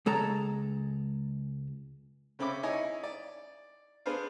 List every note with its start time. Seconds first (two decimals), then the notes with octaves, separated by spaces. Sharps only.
0.06 C#2 G#3 A4 A#5
2.39 C#3 C4 C#4 E5 B5 D6
2.63 D#4 E4 C#5 D#5 G#5 D#6
3.03 D5
4.06 B3 D4 G#4 B4 C5 F5